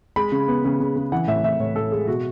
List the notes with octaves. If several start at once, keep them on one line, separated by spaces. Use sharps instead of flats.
G#3 B5
C#3
B3
C#3
C#3
C#3
E3 F#5
A2 E5
A2 E5
A2 C#5
A2 A4
G#3 G#4
B2 F#4